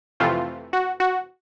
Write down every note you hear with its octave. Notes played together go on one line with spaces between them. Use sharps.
F2 C3 E3 A3 F4
F#4
F#4